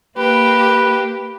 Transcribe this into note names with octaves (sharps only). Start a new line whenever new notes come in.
A#3 G4 B4